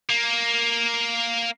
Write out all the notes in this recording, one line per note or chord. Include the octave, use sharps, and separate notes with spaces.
A#3